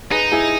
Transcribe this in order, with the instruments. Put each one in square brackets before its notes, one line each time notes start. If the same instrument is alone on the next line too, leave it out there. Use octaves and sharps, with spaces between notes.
[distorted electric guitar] D#4 [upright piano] G#4 B4
[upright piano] E4 G#4